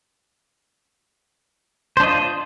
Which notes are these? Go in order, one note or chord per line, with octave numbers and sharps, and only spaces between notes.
D4 F4 C5 D#5